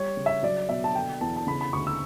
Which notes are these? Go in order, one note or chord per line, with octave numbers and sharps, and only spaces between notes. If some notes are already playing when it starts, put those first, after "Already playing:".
Already playing: G3 C#5
C#3
E5
F#3 D5
B2 E5
A5
D3 G5
E2 A5
A5
C#3 B5
B5
D2 C#6
E6